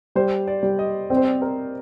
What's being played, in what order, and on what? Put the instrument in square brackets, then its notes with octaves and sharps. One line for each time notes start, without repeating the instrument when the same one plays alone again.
[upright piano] G3 [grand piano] C5
[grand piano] D5
[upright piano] G3
[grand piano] D#5
[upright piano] C4 [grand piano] D5
[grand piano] C5
D5
A#4